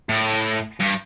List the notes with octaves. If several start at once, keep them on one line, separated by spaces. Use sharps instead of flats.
A2
G2